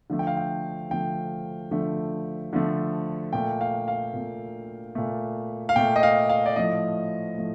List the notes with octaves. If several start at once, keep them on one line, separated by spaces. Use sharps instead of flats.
D3 F3 A3
G5
F5
G5
D3 F3 A3 G5
D3 F3 A3
D3 F3 A3
A#2 A3 G5
F5
F5
A#2 A3
A#2 A3
F5
A#2 A3 G5
D#5
F5
F5
D5
A2 F3 A3 D#5
A2 F3 A3